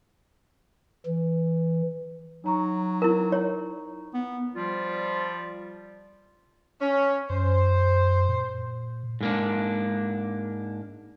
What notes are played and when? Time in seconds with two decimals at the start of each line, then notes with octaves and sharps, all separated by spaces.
1.07 E3
2.44 F#3 D#4 A#5 C#6
3.02 E4 A#4
3.32 C#5
4.14 B3
4.55 F3 G3 F4
6.81 C#4
7.30 F#2 C5
8.29 A#2
9.21 G#2 A#3 D4